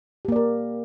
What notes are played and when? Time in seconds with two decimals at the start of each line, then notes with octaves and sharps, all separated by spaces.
0.25 G4
0.28 A#3
0.32 D5
0.36 A#4